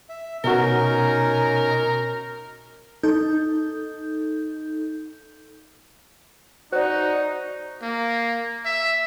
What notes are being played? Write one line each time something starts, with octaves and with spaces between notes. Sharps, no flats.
E5
B2 C#4 D#4 F#4 A#4
D#4 A4 G6
D#4 F#4 C5 D5
A#3
E5